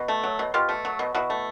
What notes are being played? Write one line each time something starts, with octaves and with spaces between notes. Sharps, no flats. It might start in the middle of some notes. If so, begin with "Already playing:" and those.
Already playing: B2
A3
F#3
B2
B2 F4 G4
A3
F#3
B2
B2 E4 F#4
A3